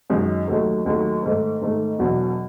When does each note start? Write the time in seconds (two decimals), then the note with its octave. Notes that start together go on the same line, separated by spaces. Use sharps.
0.10 F#2 D#3 G#3
0.48 D#2 D#3 F#3 A3
0.85 D#2 D#3 F#3 A3
1.23 G#2 D#3 A3
1.61 G#2 D#3 A3
1.99 E1 E2 B2 F#3